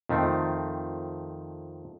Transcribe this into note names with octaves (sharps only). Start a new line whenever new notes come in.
F2 D#3 A3 C4